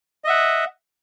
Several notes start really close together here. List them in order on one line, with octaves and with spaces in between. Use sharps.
D#5 E5 F#5